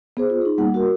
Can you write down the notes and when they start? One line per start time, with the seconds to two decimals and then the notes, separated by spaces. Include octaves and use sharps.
0.17 B3 G#4 C5
0.30 F4
0.41 D#4 G#4
0.58 G3 A#3 B3 F#5
0.74 F#4 A#4